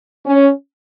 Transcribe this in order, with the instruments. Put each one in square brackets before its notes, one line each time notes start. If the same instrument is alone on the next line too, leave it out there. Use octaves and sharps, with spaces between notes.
[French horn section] C#4